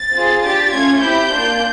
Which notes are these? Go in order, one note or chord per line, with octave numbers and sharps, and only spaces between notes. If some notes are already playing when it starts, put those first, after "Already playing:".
Already playing: A6
C4 F4 G#4
D4 G4 A6
A3 C#4 F4 G#6
C4 E4 G4 G6
A#3 D4 F4